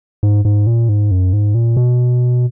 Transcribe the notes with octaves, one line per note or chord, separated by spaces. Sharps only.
G#2
G#2
A#2
G#2
F#2
G#2
A#2
B2